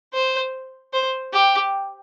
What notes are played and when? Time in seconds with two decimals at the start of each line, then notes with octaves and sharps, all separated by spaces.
0.13 C5
0.93 C5
1.33 G4